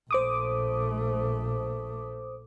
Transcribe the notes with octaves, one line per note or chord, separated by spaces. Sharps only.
A#1 A3 C5 D6 D#6